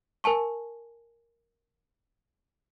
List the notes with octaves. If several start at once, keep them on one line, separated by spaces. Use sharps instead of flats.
A#4 G#5 A5 C#6